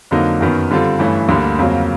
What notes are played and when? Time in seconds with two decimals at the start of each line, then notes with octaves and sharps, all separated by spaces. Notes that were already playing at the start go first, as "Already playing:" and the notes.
0.11 F2 D3 F#3 A#3 D#4
0.41 F#2 D#3 F#3 B3
0.71 D3 G3 C4 F4 A4
0.99 G2 E3 A3 C#4
1.29 D2 D3 G3 A#3
1.59 F2 C#3 F#3 A#3